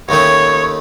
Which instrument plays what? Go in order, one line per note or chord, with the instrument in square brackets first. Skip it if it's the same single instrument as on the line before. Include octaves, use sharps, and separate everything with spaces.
[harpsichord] D#2 D#3 A3 C#4 [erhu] C#5